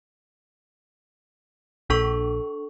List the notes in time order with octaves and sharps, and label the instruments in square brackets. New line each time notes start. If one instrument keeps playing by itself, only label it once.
[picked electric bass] A#1 [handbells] D4 A4 C#6